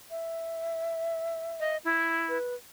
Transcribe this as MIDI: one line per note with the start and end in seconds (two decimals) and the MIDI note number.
0.11 1.76 76
1.60 1.77 75
1.84 2.38 64
2.29 2.54 71